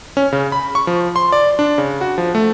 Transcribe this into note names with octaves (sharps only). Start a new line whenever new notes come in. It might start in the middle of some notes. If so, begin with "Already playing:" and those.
C#4
C#3
B5
C#6
F3
C6
D5
D4
C#3
F#4
F3
A3